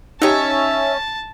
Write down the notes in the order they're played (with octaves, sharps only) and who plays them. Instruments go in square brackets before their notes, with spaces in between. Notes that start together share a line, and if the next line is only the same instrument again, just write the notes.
[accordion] C#4 [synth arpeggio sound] D#4 G4 [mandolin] C#5 E5 [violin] A5